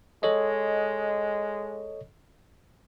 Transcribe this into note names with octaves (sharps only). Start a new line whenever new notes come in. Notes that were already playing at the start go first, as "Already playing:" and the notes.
G#3 A4 C#5 D#5